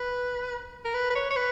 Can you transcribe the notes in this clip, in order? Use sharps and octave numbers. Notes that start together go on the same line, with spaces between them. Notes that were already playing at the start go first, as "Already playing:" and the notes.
Already playing: B4
A#4
B4
B4
C#5
C#5
B4